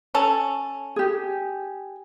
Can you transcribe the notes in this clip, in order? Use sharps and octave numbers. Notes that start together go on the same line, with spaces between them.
C#4 A4 A5
G4 G#4